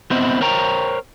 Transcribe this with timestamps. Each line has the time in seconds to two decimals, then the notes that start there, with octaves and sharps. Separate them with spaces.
0.11 B3 C4 E4 C5 D#5
0.41 A#4 C5 C#5 G5 A#5